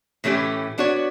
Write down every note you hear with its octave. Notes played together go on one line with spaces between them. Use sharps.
A2 E3 A3 C#4 G4
B3 D4 F#4 C#5